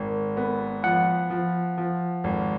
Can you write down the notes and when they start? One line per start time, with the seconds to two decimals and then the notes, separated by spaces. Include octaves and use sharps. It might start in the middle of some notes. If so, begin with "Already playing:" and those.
Already playing: G#1 A#4
0.37 B3
0.84 F3 F#5
1.30 F3
1.78 F3
2.24 G#1